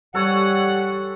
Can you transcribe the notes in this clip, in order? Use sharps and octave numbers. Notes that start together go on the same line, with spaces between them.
G3 A4 C#5 F#5 G#5